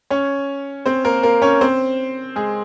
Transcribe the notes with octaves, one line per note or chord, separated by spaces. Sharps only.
C#4 C#5
C4 C5
A#3 A#4
A#3 A#4
C#4 C#5
C4 C5
G#3 G#4